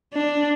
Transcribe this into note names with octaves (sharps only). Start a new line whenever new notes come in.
D4